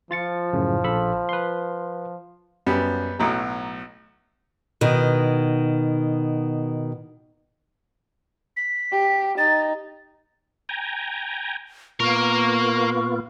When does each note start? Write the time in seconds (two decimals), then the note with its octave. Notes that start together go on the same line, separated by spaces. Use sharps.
0.11 F3 F4 A6 C#7
0.53 F#2 A2 C#3
0.84 A#1 A4 B5
1.29 B4 C6
2.66 F#2 G3 B3
3.19 B1 A2 F#3 A#5
4.81 B2 D#3
8.57 B6
8.92 G4
9.38 D#4 A6
10.69 G5 G#5 A#5
12.00 A#2 A#3 B3 F4 A#4 C#6